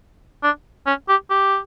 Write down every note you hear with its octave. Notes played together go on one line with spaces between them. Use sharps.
D4
C#4
G4
G4